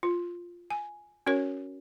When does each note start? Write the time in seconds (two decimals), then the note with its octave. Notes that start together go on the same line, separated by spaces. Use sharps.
0.03 F4
0.70 G#5
1.26 C#4 F#4 A#4 C#5